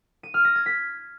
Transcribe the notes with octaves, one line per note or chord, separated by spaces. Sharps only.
D#7
F6
A#6
G#6
B6